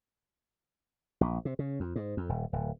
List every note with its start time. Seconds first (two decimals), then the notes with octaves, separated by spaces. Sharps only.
1.21 A#1
1.45 C3
1.59 C#3
1.80 F2
1.96 G#2
2.17 F2
2.29 D#1
2.53 D1